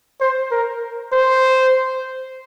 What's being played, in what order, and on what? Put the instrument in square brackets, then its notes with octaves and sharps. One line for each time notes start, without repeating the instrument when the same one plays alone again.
[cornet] C5
A#4
C5